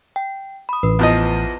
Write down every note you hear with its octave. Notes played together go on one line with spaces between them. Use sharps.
G5
B5 D#6
A1 B4
E2 F3 D#5